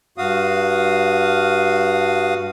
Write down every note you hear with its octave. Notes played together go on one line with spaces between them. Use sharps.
G2 F#4 F5 D#6